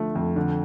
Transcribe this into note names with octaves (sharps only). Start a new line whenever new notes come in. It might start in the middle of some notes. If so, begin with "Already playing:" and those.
Already playing: D3 F3 A3
F2
D3